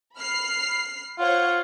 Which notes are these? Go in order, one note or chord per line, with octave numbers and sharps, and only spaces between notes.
B5 F6 C7
F4 C5 C#5 F#5